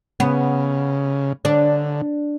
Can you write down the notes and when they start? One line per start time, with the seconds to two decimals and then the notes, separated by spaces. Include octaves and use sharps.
0.20 C#3 B3
1.45 D3 D4